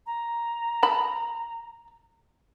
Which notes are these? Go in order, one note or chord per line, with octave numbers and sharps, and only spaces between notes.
A#5
A5 B5